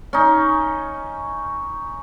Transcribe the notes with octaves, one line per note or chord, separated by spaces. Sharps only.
C#4 D#4